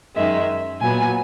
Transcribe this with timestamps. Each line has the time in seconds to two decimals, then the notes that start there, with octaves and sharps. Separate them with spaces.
0.16 F#2 D#3 G#3 E5
0.81 A#2 F#3 B3 G#5